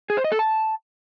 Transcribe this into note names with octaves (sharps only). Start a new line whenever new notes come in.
G#4
C5
D#5
A4
A5